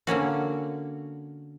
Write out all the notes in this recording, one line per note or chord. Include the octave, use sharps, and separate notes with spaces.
D3 A#3 C#4 F#4